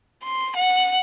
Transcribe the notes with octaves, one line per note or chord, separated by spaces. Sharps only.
C6
F#5